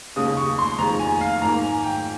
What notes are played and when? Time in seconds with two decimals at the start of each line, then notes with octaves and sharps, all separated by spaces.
0.16 D#2 C#3 G#3 D#6
0.37 C#6
0.59 C6
0.79 F2 D#3 G#3 A#5
0.99 G#5
1.21 F5
1.42 G#2 D#3 A#3 A#5
1.63 G#5
1.84 G5